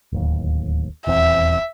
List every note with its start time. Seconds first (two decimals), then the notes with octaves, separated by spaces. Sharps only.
0.12 D1 D#2
1.07 D#1 E2 C4 E5